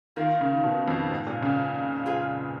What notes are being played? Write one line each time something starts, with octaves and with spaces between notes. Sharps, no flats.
D#3 A#3 F4 A#4
C#3
B2
F2
G#2
A#2
C#3
F4 G#4 B4 F#5